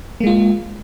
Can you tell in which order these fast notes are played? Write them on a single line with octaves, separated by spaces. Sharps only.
A#3 G#3 F4